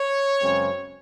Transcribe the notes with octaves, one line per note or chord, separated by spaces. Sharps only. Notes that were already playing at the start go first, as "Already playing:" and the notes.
Already playing: C#5
F#2 C#3 G#3 C4